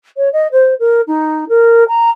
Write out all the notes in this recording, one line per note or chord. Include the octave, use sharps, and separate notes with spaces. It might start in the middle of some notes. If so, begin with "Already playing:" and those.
C#5
D#5
C5
A#4
D#4
A#4
A#5